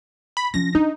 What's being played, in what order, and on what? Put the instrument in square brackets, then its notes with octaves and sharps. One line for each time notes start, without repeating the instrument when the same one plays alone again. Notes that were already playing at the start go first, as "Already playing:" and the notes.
[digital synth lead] B5
[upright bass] F3 C#4 [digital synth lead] A#6
[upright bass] D4 [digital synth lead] D#4